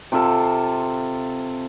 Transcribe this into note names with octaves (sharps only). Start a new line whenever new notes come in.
C3 F4 A4